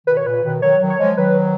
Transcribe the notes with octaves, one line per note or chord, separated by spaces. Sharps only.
B2 D#3 B4
C#5
A#2 C#3 B4
B2 D#3
D#3 F#3 C#5
D#3 F#3
C#5
F3 G#3
D#3 F#3 B4